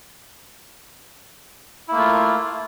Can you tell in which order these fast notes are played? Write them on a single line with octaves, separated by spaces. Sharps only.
E4 A#3 A3 F4